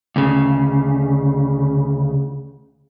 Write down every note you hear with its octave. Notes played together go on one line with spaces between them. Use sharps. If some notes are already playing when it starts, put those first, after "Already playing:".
D2 C#3